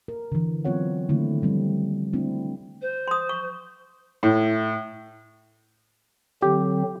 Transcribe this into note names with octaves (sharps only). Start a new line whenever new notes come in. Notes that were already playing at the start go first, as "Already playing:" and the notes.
A#4
D3 E3
F#3 B3 C4 F4 C#5 F#5
D3 D#3 A3 A#3 C4 E4
F3 G3 C4
A3 C4 D4 E4
C5
C6 D#6
C#6
A2
D3 F#3 C4 G4